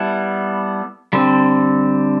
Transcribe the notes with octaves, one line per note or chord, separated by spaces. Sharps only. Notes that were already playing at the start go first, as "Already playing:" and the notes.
Already playing: G3 B3 E4 A4
D3 G3 C4